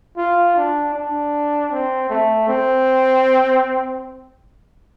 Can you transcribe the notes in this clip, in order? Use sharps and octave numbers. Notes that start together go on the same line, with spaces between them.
F4
D4
D4
C4
A3
C4